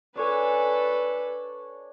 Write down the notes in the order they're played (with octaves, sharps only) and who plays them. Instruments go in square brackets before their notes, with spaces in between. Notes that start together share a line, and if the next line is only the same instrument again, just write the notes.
[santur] D4 C#5 G#5 [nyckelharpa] A4 B4